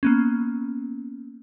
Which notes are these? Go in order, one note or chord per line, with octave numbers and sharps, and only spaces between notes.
A#3 B3 C#4